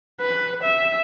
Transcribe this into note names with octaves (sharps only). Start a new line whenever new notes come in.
B4
E5